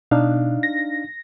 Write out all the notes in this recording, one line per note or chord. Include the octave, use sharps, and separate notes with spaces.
B2 D4 D#4 F5
A#6